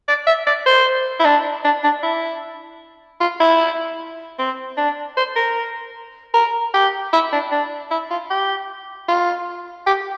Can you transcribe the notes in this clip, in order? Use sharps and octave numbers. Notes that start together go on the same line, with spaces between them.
D5
E5
D5
C5
E4
D4
D4
D4
E4
F4
E4
C4
D4
C5
A#4
A#4
G4
E4
D4
D4
E4
F4
G4
F4
G4